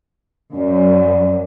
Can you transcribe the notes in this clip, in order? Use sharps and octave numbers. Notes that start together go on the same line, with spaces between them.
F#2 C#4 D5